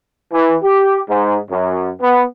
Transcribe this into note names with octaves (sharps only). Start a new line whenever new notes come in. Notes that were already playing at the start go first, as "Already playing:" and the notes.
E3
G4
G#2
F#2
B3